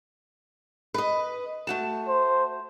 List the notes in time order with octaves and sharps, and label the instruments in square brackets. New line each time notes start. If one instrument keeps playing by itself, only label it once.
[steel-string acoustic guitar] B4 D#5
A3 F#4 A5
[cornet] C5